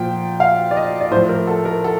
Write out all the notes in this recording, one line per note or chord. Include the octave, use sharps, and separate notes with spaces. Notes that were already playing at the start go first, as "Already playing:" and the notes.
Already playing: A#2 F3 G5
F5
D5
D#5
D5
A2 F3 C5
A#4
A4
A#4
A4